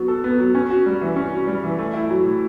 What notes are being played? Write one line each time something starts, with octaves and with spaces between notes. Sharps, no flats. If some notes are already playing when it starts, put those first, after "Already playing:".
Already playing: F#3 B3 F#4
A4
B3
F#3
C#4
F#4
G3
E3
C#4
F#4
G3
E3
A3
E4
F#3
A2